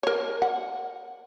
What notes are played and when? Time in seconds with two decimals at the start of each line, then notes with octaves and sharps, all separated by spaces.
0.03 A#4 C#5
0.42 F#5